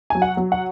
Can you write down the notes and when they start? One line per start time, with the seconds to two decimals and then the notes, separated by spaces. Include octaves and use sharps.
0.10 F#3 G#5
0.22 F#5
0.37 F#3
0.52 F#5